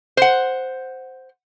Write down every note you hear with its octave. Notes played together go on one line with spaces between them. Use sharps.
C5 F#5